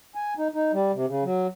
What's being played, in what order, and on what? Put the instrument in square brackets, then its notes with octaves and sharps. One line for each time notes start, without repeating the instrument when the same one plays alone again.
[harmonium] G#5
D#4
D#4
G3
C3
C#3
F#3